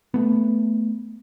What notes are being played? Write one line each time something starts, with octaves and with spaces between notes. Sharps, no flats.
A3 B3